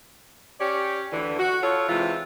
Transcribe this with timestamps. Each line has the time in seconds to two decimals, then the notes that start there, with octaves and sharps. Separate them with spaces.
0.60 C#4 G4 C#5 D5
1.12 D2 D3 E3
1.39 F#4
1.63 F4 A4 C#5
1.89 C3 E3 G#3 F4